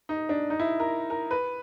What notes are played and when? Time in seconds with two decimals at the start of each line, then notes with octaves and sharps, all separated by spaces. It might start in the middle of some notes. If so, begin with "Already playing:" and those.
0.09 D#4
0.29 D4
0.50 D#4
0.60 E4
0.80 A#4
1.10 A#4
1.31 B4